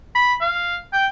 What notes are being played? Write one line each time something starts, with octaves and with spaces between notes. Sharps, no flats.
B5
F5
G5